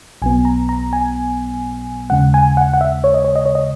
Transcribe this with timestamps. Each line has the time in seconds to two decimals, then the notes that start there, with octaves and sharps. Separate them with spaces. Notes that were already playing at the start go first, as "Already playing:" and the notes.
0.22 B1 B2 F#3 B3 G#5
0.45 A#5
0.69 A#5
0.93 G#5
2.10 D#2 C#3 G#3 F#5
2.34 G#5
2.57 F#5
2.74 F#5
2.81 E5
3.04 C#5
3.14 D#5
3.24 C#5
3.36 D#5
3.46 C#5
3.55 D#5